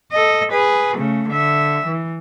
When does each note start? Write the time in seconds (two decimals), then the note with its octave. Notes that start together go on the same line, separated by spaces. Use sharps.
0.12 A4 D#5
0.52 G#4 B4
0.97 C#3 A3
1.29 D3 E5
1.86 E3